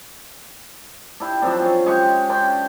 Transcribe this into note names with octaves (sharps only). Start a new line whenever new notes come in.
D4 E4 G4
F3 F#3 C4 D4
C#4
G#3 G4 C#6
C#4 D4 G5 C6